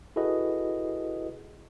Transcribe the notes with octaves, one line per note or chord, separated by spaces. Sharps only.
E4 F#4 G#4 A4 B4 D#5